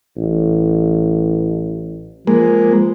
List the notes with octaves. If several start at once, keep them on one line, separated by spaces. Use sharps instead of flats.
A1
F3 G#3 A#3